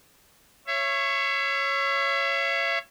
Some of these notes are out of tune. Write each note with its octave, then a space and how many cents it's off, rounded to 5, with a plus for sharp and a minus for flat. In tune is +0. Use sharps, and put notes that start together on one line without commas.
C#5 -5 E5 +35